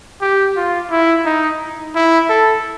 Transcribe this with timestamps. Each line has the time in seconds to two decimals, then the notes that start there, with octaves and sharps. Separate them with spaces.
0.22 G4
0.56 F4
0.91 E4
1.26 D#4
1.95 E4
2.30 A4